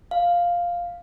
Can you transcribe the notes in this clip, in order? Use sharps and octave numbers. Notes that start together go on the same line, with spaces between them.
F5